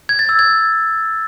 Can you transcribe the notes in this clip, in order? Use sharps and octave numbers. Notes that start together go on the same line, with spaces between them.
G#6
A6
E6
G#6